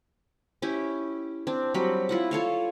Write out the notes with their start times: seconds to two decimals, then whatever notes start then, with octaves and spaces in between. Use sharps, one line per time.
0.62 C#4 E4 G4
1.47 C4 D4
1.74 F#3 G3 C4 B5
2.09 E4 F4 F#5
2.31 F4 A4 C#5 F5